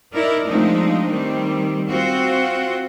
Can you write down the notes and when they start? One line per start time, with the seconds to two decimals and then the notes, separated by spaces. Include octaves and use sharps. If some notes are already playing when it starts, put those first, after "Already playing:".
0.14 D#4 E4 A#4 D5
0.47 F3 G#3 A3 C4 D4 D#4
1.09 D#3 G3 C4
1.90 C4 F4 F#4